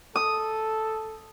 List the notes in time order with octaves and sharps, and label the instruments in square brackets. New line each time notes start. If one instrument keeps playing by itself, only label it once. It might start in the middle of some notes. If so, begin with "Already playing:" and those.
[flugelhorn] A4 [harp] D#6